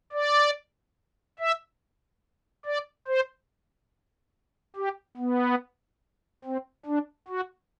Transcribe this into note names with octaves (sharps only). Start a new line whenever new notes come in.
D5
E5
D5
C5
G4
B3
C4
D4
F#4